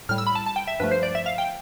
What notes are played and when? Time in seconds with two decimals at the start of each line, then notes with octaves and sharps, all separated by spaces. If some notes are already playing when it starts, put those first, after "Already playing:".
0.09 A2 G3 F6
0.18 E6
0.27 B5
0.35 A5
0.46 A5
0.56 G5
0.68 E5
0.80 G2 F3 A3 B4
0.91 C5
1.03 D5
1.15 E5
1.26 F5
1.38 G5